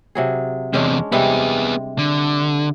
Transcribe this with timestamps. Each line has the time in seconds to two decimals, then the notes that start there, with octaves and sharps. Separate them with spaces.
0.15 C3 F#3 G#4
0.73 E2 C3 G#3 C#4 D4
1.12 C3 G3 G#3 B3 G#4
1.98 D3